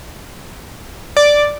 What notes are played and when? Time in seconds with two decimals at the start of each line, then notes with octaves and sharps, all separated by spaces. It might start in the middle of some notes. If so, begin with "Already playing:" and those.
1.17 D5